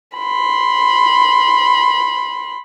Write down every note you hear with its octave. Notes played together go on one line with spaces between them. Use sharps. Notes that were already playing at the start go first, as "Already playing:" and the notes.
B5 C6